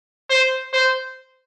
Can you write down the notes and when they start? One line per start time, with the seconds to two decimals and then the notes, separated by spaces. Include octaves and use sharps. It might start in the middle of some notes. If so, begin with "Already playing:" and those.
0.30 C5
0.73 C5